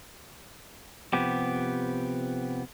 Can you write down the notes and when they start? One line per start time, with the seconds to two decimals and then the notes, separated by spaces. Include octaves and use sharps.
1.13 C3 F3 B3 G4